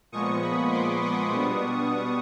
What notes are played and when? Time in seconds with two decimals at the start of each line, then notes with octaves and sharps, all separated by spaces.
0.12 A#2 F3 G#3 B3 C#6 D#6
0.42 B5 C#6
0.71 C6 D6
1.02 C#6 D#6
1.31 B2 G3 B3 D4